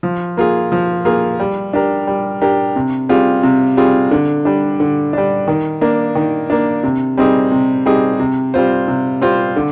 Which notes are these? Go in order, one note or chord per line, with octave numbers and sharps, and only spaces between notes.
F3
A#3 F4 G#4
F3
A#3 F4 G#4
G3
D4 G4 A#4
G3
D4 G4 A#4
C3
G3 C4 F4 G#4
C3
G3 C4 F4 G#4
D3
G3 D4
D3
G3 D4
D#3
A#3 D4
D#3
A#3 D4
C3
G3 C4 D#4 G#4
C3
G3 C4 D#4 G#4
C3
G3 C4 F4 C5
C3
G3 C4 F4 C5
D3